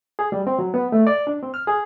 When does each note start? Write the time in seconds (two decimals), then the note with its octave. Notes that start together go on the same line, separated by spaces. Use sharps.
0.19 G#4
0.32 G3
0.47 C4
0.59 F#3
0.74 B3
0.92 A3
1.07 D5
1.27 D4
1.43 C4
1.54 F6
1.67 G#4